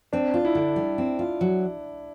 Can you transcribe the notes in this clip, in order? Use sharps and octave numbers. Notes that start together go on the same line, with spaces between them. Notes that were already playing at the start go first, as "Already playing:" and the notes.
C4 D4
F4
E4
D3
G3
C4
F4
F#3